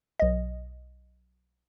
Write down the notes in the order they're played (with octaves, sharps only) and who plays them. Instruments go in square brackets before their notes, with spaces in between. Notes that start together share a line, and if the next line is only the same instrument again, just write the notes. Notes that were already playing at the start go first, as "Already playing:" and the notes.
[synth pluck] B1 D#5